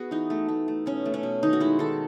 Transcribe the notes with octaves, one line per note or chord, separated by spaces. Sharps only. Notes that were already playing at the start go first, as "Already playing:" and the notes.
Already playing: B3 F#4 G#4
E3 D#4
A3
A3
A3
B2 C#4
A3
C#4
B2
D#3 D#4
F#4
G#3 E4
D#3 A4